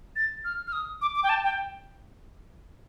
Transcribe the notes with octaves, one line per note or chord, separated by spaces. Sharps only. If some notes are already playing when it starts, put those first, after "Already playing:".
A6
F6
F6
D#6
D6
D6
G5
A5
G5